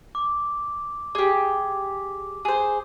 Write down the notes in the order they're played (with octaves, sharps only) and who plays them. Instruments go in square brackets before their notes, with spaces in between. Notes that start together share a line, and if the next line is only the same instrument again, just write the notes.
[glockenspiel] D6
[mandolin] G4 G#4 [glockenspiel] D6
[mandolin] G#4 C5